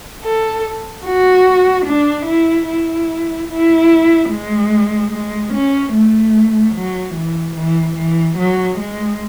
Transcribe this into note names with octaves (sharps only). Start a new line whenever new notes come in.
A4
F#4
D4
E4
E4
E4
G#3
G#3
C#4
A3
F#3
E3
E3
E3
F#3
G#3